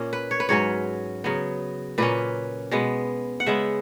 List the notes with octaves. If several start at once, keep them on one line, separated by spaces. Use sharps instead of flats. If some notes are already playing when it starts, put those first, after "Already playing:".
Already playing: A#2 A#3 C#4
B4
C#5
B4
G#2 F#3 C#4 C#5
C#3 F#3 B3
A#2 A#3 C#4 B4
B2 G#3 B3
F#5
C#3 G#3 B3 E5